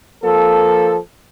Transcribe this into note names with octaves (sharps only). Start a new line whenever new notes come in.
F3 A#3 A4